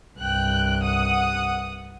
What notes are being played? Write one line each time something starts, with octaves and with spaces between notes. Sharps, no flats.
C2 G2 G5 F#6
F#5 D#6